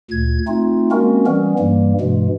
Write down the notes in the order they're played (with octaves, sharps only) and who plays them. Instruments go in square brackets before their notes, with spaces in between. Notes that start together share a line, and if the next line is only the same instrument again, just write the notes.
[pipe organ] D2 A#2 G#6
A3 C4 D#4 F4
G#3 A#3 C4 C#4 F#4 A#4
E3 G3 B3 C#4
G2 E3 G3 A#3
G2 B2 E3 G#3